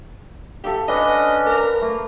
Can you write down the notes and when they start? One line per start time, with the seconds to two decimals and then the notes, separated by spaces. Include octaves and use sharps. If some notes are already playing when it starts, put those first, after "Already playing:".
0.64 G4 A4 E5 F5
0.88 C#4 D4 B4 D#5 F5
1.46 A#4
1.81 A3 A#3